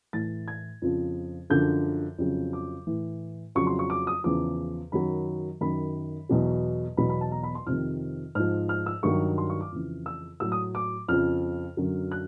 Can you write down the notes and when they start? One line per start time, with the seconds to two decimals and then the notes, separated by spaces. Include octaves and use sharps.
0.13 A2 E3 A6
0.48 G#6
0.82 F2 C#3 F3
1.50 F#2 D3 F3 G6
2.18 F2 C#3 F#3
2.53 D6
2.87 A2 E3
3.55 F2 C#3 F#3 C#6
3.67 C6
3.79 C#6
3.90 D6
4.07 D#6
4.24 E2 C#3 F3 D6
4.92 F#2 D#3 F#3 B5
5.61 F#2 D#3 F#3 B5
6.29 E2 B2 F#3
6.97 E2 B2 F#3 B5
7.09 B5
7.21 A5
7.32 A#5
7.43 B5
7.55 C6
7.66 F2 C3 D#3 F6
8.35 G#2 F3 F6
8.69 F6
8.86 E6
9.03 G2 D#3 F#3 C#6
9.38 C6
9.50 C#6
9.61 D6
9.72 F2 C#3 E3
10.06 E6
10.40 A2 F#3 E6
10.52 D#6
10.75 D6
11.08 F2 C#3 F3 F6
11.77 F#2 D3 F#3
12.12 F#6